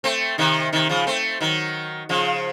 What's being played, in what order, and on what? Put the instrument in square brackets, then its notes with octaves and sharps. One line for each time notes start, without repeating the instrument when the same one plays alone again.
[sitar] A3 C4
C3 D#3
C3 D#3
C#3 F3
A3 C4
D#3 F#3
C#3 F3